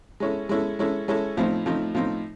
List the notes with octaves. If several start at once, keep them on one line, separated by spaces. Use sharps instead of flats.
G#3 C#4 E4 A4
G#3 C#4 E4 A4
G#3 C#4 E4 A4
G#3 C#4 E4 A4
A2 F3 A3 C4 D#4
A2 F3 A3 C4 D#4
A2 F3 A3 C4 D#4